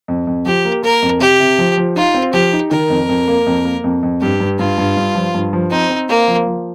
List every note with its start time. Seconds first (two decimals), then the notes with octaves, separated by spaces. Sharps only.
0.08 F2
0.27 F2
0.46 F3 G4
0.65 A#3
0.83 A#3 A#4
1.02 F2
1.20 C3 G4
1.40 C3
1.58 F3
1.77 F3
1.96 D#4 F4
2.14 C4
2.34 F3 G4
2.53 D#4
2.71 D#3 A#4
2.90 F2
3.09 F2
3.28 A#3
3.46 F2
3.65 A#3
3.84 F2
4.03 F2
4.21 G2 G4
4.40 G2
4.59 G2 F4
4.78 G2
4.97 G2
5.15 F3
5.34 G2
5.53 F3
5.71 C4 D#4
5.90 C4
6.09 A#3 C4
6.28 F3
6.47 F3